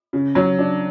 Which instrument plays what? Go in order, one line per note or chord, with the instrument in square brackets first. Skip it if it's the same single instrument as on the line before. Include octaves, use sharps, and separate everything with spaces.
[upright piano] C#3
F#3
D4